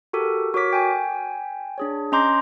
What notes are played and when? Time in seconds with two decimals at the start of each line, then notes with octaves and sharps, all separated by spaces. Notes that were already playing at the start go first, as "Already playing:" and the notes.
0.13 F#4 G4 A4 A#4
0.54 F#4 A#4 C#5 D6 B6
0.73 G5 G#5
1.78 D4 G#4 C#5
2.12 C#4 D#5 A#5 C6 D6 G6